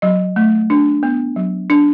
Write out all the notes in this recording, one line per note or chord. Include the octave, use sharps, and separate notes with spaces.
F#3 D#5
A3
D4
B3
F#3
D4